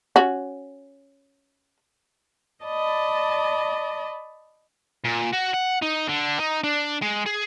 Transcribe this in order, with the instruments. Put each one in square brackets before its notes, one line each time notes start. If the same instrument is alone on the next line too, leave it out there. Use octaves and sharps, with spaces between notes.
[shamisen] C#4 F#4
[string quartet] D5 D#5 A5 B5
[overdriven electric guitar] A#2
F#4
F#5
D#4
D3
D#4
D4
G#3
G#4